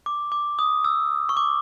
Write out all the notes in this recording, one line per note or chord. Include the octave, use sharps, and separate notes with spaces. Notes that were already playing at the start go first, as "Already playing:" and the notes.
D6
D6
D#6
E6
C#6
D6